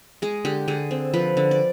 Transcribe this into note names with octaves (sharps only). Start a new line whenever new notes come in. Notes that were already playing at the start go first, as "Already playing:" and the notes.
G#3 G#4
D3 G4
D3 G#4
C4
F3 B4
D3
D5